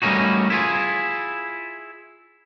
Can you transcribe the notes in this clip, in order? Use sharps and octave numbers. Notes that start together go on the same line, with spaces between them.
G3 A3 A#3 C#4 D#4 F#4
E4 F4 G#4